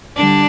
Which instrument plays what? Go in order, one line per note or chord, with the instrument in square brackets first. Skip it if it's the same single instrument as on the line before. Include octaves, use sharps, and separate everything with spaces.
[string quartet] D3 G3 D4 D5